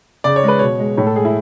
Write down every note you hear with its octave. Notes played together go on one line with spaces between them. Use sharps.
C#3 D5
C#5
G#3 B4
B2 C#5
G#3
A2 C#5
A4
G#3 G#4
E4